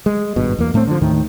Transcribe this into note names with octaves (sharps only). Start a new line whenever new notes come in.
G#3
G#1 G2 B2
E2 A#3
A2 A3 B3 C4
D3 F3
D#2 A2 D#3